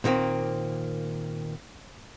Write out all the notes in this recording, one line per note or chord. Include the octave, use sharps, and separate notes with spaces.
A#2 D#3 A#3 C4